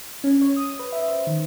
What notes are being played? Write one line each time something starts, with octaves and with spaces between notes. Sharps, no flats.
C#4
C#5
D#6
B4
E5
C5
D#3